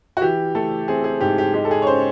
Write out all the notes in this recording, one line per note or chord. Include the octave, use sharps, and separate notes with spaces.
F#4
E3 G4
A3 A4
C4 G#4
G#4
G#2 G4
G4
G#3 G4
A4
G#4
C#5
C#4 C5